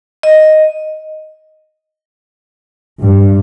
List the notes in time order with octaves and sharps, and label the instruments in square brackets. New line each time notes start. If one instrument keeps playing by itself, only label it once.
[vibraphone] D#5
[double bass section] G2